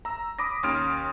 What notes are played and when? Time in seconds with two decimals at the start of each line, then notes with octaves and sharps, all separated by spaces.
0.05 A#5 E6
0.39 B5 D6 D#6 A#6
0.63 D#2 C#4 C6 D#6 F6 D7